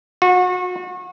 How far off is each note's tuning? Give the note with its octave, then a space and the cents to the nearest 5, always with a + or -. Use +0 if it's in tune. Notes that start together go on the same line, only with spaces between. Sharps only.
F#4 -35